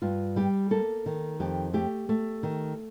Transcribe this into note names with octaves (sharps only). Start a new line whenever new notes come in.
G2 F4
G3 G4
A#3 A4
D#3
F2 G4
A3 G4
A3
D#3